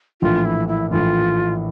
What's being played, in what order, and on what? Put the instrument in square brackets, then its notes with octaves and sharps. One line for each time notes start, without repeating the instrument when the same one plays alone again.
[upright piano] A#1 A2 E3 [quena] F4
[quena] E4
E4
[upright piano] A#1 A2 E3 [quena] F4